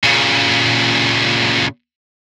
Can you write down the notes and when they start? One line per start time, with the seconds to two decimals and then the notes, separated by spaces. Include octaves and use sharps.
0.04 A#2 C#3